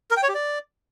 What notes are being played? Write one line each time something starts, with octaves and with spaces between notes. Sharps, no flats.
A#4
G5
C#5
G4
D5